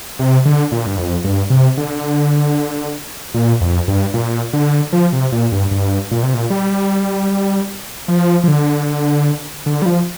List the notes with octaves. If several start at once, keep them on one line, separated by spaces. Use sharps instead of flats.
C3
D3
A#2
G2
F2
G2
C3
D3
A#2
F2
G2
A#2
D3
F3
C3
A#2
G2
G2
A#2
C3
A#2
G3
F3
F3
D3
D3
G3
F3